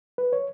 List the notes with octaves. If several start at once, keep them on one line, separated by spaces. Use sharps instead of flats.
B4
C#5